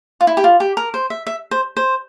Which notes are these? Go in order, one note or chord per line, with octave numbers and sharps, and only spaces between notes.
F4
E4
G4
F4
G4
A#4
C5
E5
E5
C5
C5